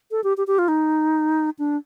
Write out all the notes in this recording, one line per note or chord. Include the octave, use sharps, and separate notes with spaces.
A4
G4
G4
G4
F4
D#4
D4